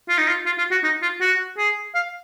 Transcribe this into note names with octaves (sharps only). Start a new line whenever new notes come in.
F4
D#4
F4
F4
F4
F#4
D#4
F4
F#4
G#4
F5